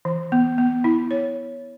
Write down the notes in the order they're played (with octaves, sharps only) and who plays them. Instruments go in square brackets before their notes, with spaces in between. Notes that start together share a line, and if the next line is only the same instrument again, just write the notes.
[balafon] E3
B3
B3
E4
C#5